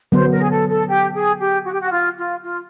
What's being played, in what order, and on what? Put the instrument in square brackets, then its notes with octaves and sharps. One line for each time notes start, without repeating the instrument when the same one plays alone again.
[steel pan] D3 F#3 B3 [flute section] C5
[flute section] A#4
G#4
A4
A4
G4
G#4
G4
F#4
G4
F#4
F4
F4
F4